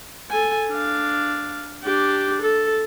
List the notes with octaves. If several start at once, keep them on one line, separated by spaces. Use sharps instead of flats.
A4 G#5
D4 F5
D4 G4
A4